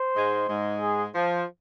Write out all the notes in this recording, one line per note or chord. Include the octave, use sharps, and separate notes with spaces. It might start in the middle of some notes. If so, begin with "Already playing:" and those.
Already playing: C5
G#2 G#3
G#2 G#3
G#4
F3